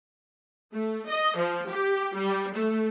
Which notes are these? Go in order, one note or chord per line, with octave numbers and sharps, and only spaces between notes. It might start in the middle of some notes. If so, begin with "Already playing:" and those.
A3
D#5
F3
G4
G3
A3